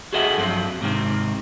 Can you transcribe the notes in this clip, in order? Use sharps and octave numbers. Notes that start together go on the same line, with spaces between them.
F#4 G#4 A4 D#5 E5 F#5
G2 F3 F#3 C4
G#2 C3 D#3 C4